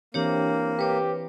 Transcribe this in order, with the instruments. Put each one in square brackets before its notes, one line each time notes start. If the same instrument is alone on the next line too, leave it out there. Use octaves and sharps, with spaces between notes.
[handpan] E3 C4 E4 [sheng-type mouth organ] A#3 [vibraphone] D4 G4 C#5
[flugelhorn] G4 [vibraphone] B4 C#5